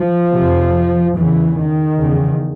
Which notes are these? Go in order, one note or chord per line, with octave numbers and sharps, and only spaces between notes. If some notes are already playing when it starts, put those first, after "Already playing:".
Already playing: F3
F2 C3
E2 C#3 E3
D#3
E2 C#3